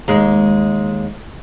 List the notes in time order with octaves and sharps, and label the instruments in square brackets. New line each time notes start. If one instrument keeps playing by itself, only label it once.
[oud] D#2 G#3